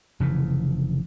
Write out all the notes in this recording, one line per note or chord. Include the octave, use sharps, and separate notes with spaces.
F1 C#3 E3